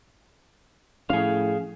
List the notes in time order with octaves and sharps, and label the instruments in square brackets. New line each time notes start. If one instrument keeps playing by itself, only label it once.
[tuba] A2 [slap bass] F3 C#4 [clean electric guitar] G#4 F5